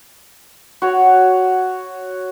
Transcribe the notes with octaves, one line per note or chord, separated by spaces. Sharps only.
F#4 C#5